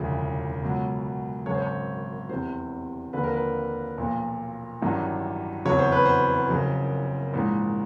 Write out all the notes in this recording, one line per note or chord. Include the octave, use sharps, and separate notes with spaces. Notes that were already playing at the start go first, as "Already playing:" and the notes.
Already playing: E1 D2 C#3 F3
C#2 B2 F#3
G#1 F#2 C#3 F#3 C#5
C5
C#5
F1 E2 C3 C5
D#2 D3 F3 B4
A#4
B4
B1 A#2 F3
A1 G2 D#3 F#3
F1 E2 C#3 F#3 C#5
C5
B4
C5
F#1 F#2 C#3 F3
A#1 G#2 E3